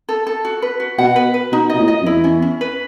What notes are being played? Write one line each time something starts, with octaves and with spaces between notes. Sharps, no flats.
A4
A4
F#4
B4
F#4
B2 F#5
B4
B4
B2 D#4
B2 D#5
A2
D#5
F#2
E2 E4
C#4
C#4
B4